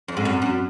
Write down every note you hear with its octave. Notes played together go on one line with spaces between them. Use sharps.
F2
G#2
F#2
F#2